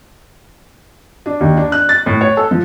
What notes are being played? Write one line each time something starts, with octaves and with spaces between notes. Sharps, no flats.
D4
D#2
D4
F#6
A6
A2
C#5
A4
F3